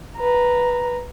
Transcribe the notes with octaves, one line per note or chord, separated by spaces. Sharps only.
B4 A#5